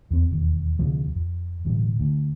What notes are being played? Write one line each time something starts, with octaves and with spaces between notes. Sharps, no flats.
E2 C4
E1 D#2
D2 C3 F3 G#3
F2
D1 B2 E3 G3
D2